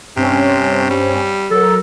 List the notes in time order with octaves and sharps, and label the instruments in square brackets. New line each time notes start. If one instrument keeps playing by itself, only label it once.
[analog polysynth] G2 C4 C#4 [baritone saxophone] C3
[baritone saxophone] G3
[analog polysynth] F#3 A#4 [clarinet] A4